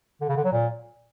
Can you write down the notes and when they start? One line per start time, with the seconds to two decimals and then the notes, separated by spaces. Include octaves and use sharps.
0.21 D3
0.29 C#3
0.37 D3
0.45 F#3
0.52 A#2